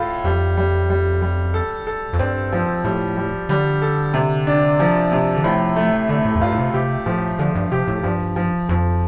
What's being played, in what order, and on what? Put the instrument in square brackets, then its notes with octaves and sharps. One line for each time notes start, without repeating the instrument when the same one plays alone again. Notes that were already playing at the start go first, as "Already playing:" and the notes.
Already playing: [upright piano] A2 F4 A4
[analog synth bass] F2 [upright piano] G3
[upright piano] G3
G3
G3
A4
A4
[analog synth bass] F2
[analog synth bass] G2 [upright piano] C4
[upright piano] F3
[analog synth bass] A2 [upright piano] G3
[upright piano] G3
[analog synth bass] D3 [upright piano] G3
[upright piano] A4
C3
D4
F3
C3
[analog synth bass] D3
[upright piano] A2 [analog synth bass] F3
[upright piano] A3
[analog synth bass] D3 [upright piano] A3
[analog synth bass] A2
F2
[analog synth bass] G2 [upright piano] F4
[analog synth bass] A2
C3
[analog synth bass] C3 [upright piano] G4
[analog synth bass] A2 [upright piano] F3
[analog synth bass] D3 [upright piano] F3
[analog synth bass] G2
[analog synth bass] C3 [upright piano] G4
[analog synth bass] A2
[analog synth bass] G2 [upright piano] F3
[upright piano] F3
[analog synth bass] F2 [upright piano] F3